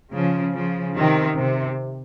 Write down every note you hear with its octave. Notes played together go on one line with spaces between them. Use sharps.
C#3 F3
C#3 F3
C3 D#3
C3